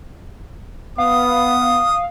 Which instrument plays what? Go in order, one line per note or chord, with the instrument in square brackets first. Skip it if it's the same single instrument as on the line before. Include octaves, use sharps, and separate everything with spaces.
[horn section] B3 [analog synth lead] F5 [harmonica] D#6